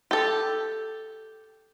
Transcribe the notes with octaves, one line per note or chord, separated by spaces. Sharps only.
G4 A4